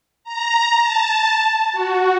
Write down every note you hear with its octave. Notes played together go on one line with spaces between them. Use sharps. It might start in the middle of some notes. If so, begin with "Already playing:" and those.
A#5
A5
F#4